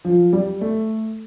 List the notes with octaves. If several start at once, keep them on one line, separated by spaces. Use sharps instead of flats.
F3
G3
A3